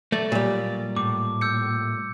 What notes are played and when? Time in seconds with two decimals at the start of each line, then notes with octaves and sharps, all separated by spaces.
0.12 F#3 A3 D5
0.32 A#2 G3
0.96 A2 D6
1.41 E6 G6 C#7